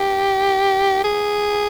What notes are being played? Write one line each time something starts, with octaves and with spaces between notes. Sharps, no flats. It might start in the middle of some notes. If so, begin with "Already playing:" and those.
Already playing: G4
G#4